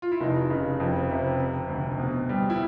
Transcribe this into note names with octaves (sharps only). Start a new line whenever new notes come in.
F4
E4
F1 D#4
C#3
F2
C3
C3
D2
B2
G3
E4